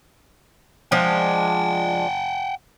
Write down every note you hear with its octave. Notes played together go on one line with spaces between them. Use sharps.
F3 G#3 D4 F#5 G5